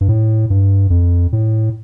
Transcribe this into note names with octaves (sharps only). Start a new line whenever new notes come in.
G2
A2
G2
F2
A2